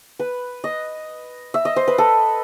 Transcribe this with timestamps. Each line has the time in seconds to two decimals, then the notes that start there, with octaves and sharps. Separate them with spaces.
0.19 B4
0.64 D#5
1.54 E5
1.65 D#5
1.76 C5
1.88 B4
1.98 A4